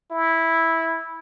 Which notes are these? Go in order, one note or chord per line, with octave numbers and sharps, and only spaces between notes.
E4